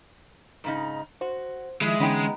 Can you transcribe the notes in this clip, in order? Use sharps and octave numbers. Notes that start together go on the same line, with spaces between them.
G#2 C#3 D#4
F#4 C5
D#3 F3 G#3 E4
D3 E3 B3 C#4 D#4 G5